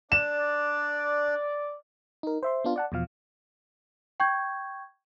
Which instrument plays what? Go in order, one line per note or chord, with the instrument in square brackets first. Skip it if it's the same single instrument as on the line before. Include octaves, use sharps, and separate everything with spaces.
[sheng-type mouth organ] D4 [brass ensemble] D5 [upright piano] E7
[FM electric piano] D#4 A#4
C5 E5 C6
B3 D4 F4
D5 F#5 A5
E2 B2 F3 F5
[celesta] G5 C#6 G6 G#6